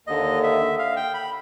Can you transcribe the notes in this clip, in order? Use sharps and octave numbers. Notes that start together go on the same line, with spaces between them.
D#2 D3 D#5
E5
F5
G5
B5